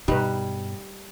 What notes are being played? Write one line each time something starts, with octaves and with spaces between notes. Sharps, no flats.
G2 B2 G3 D#4 B4